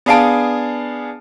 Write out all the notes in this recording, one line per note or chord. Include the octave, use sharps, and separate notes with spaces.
B3 D4 G#4 F5 A5 D7